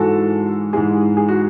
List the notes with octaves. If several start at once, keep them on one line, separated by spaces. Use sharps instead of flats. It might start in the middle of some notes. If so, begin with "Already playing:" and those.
Already playing: G#2 E3 G#3 F#4 A4
G#2 E3 G#3 G#4
G#4
F#4